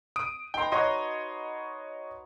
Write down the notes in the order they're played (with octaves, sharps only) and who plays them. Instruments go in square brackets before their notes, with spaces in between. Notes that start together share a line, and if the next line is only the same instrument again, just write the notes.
[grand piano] D#6 D7
[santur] D#4 B4 A#5 [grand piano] G5 C6
[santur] F#4 [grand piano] C#5 D#5 C6